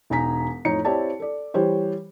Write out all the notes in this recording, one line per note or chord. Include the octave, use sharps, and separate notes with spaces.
E1 D#4 G#5 A#5 B6
F2 A2 D#4 C#5 C#7
C4 E4 G4 C#5 D5 A5
A4 D5
E3 G3 G4 C5 C#5